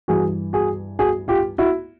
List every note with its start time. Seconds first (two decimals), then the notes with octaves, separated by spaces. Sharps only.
0.08 G2 E3 F#4 G#4
0.53 F#4 G#4
0.99 F#4 G#4
1.28 F4 G4
1.58 E4 F#4